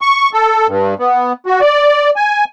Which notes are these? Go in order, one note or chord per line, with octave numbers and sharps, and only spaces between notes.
C#6
A4
G2
B3
F#4
D5
G#5